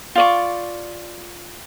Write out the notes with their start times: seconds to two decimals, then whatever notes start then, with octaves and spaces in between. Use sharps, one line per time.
0.15 F4 D5 C#6